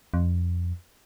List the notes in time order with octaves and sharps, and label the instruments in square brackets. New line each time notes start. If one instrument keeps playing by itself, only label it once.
[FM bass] F2